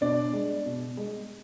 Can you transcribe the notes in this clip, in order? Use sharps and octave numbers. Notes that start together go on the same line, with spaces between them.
B2 D4 D5
G#3
B2
G#3